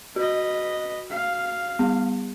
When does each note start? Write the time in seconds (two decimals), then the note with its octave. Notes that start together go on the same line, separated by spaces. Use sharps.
0.16 F#4 B4 D#5
1.10 F5
1.79 G3 B3